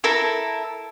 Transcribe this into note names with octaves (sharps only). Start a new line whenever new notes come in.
E4 A4 A#4